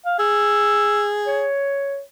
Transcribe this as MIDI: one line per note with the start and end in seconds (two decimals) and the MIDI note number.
0.06 0.15 77
0.19 1.47 68
0.19 1.05 88
1.27 2.00 73